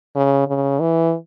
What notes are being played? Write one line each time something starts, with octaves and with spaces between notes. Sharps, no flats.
C#3
C#3
E3